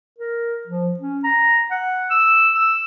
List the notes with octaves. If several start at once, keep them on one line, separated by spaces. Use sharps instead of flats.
A#4
F3
C#4
A#5
F#5
E6
E6